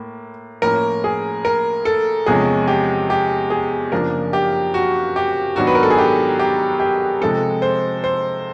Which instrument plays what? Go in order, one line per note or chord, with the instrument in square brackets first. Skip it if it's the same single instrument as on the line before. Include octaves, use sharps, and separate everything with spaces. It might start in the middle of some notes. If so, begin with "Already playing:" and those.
Already playing: [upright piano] A2 A#3
A2 F3 A#3 C#4 A#4
G#4
A#4
A4
E2 C3 F3 G#3 C#4 G#4
G4
G4
G#4
F#2 C#3 F3 A#3 D4 A#4
G4
F#4
G4
G#2 D#3 F#3 B3 D4 F#4
B4
A#4
A4
G#4
G4
G4
G4
C3 F3 G#3 C4 A4
C5
C5